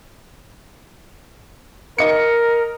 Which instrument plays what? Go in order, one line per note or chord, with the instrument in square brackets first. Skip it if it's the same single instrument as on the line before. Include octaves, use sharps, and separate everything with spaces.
[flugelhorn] A#4 [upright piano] D#5 C#7